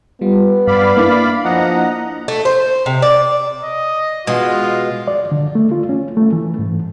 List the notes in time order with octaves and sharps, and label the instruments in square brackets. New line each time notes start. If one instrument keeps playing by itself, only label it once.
[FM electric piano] G3 F4 [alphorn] B3
[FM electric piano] G2 [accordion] D5 F5 B5
[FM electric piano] A#3 D4 E4
[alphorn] F3 [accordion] D#5 F#5 A#5
[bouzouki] A3
C5
C3
D5
[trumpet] D#5
[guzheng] B2 G#3 [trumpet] F4
[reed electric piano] D5
D3
A3
F4
C#4
A3
E3
G#2